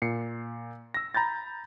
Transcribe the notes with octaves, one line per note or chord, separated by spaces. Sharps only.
A#2 C7 C#7
E6 A#6
A#5 B5 G6 A6